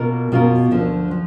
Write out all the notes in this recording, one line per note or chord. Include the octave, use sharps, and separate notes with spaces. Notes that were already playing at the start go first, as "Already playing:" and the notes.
Already playing: B2 A#3 F4 A#4
B2 A#3 F4 A#4
D2 D3 F3
F3